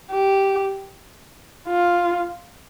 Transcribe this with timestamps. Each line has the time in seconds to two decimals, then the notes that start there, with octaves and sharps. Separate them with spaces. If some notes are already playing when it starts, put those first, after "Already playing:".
0.11 G4
1.68 F4